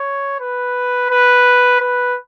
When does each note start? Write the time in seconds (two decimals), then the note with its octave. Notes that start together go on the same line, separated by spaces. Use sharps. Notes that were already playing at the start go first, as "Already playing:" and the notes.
Already playing: C#5
0.40 B4
1.10 B4
1.81 B4